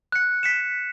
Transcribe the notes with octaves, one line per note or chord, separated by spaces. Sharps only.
F#6 C#7
B6 C#7 E7